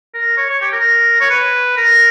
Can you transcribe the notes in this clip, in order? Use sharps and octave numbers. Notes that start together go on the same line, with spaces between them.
A#4
C#5
C#5
G4
A#4
C#5
B4
A#4